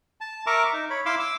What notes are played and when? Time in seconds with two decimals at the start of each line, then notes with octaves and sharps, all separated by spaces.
0.21 A5
0.46 A#4 E5 A#5 C#6 D6
0.73 D#4
0.90 C#5 B5
1.06 E4 F5 C6 D6 E6
1.19 D6 E6